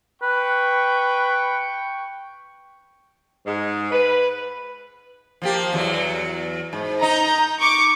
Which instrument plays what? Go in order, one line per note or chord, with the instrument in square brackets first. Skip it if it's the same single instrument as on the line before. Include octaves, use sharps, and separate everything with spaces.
[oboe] B4 [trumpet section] G5 C#6
[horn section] G#2
B4
[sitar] F3 A#3 G4
E2 F#3
G#2
[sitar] D#4 [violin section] A#5 G6
[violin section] C#6 D6